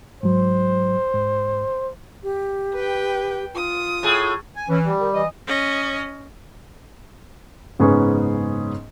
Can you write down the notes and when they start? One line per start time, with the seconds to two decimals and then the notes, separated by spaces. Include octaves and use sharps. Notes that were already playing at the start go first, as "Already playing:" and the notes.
0.23 G#2 F#3 C5
1.13 G#2
2.23 G4
2.73 B4 G5
3.54 F4 D#6
4.03 A2 G#4
4.56 G#5
4.69 E3 C#4
4.84 G3
5.01 D#3
5.14 E3 D#5
5.47 C#4 D#5
7.79 F#1 G#2 B3 C#4 G#4 C#6